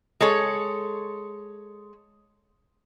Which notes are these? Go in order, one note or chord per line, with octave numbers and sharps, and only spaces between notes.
G#3 A4 C#5